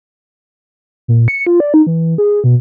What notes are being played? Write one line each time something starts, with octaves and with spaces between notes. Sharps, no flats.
A#2
C#7
F4
D5
D#4
E3
G#4
B2